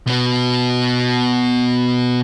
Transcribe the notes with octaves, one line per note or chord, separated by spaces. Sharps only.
B2 B3